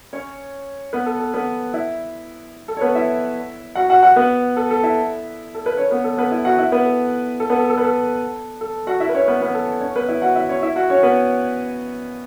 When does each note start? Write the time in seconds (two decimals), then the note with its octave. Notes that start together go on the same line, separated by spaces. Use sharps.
0.13 C#4 C#5
0.93 B3 B4
1.06 A4
1.20 A4
1.34 B3 B4
1.73 E4 E5
2.68 A4
2.77 C#5
2.81 B3 B4
2.95 E4 E5
3.75 F#4 F#5
3.90 F#4 F#5
4.03 F#4 F#5
4.16 B3 B4
4.57 A4
4.71 A4
4.83 E4 E5
5.55 A4
5.66 B4
5.77 C#4 C#5
5.91 B3 B4
6.04 A4
6.18 B3 B4
6.32 E4 E5
6.45 F#4 F#5
6.58 E4 E5
6.72 B3 B4
6.85 A4
7.40 A4
7.50 B3 B4
7.59 A4
7.70 A4
7.78 B4
7.84 A4
8.61 A4
8.87 F#4 F#5
9.00 E4 E5
9.09 B4
9.14 C#4 C#5
9.28 B3 B4
9.41 B3 B4
9.54 A4
9.81 C#4 C#5
9.96 B3 B4
10.08 E4 E5
10.22 F#4 F#5
10.35 E4 E5
10.49 C#4 C#5
10.62 E4 E5
10.76 F#4 F#5
10.90 C#4 C#5
11.03 B3 B4